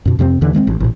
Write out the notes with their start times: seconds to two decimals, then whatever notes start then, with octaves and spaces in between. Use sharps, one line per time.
0.05 F#2 B2
0.19 F2 C3 A3 C4
0.41 D#2 D3 E3
0.53 D#3 G#3 A3 C4
0.67 A1
0.80 A1 A#2